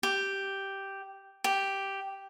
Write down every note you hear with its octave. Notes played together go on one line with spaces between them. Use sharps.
G4
G4